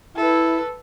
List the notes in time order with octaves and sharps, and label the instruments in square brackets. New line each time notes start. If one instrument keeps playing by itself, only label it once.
[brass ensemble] E4 [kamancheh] A4 B4